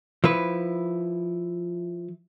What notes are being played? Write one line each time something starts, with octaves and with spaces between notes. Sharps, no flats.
F3 E4 B4